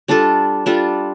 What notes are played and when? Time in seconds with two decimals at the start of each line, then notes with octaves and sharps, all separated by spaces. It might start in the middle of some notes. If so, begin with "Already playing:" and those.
0.08 G3 D4 F4 A4
0.66 G3 D4 F4 A4